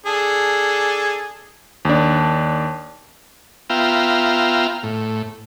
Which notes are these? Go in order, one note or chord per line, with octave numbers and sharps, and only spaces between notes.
D4 G#4 A4
D#2 D4
B3 F4 E5 F5 G5 A#5
A2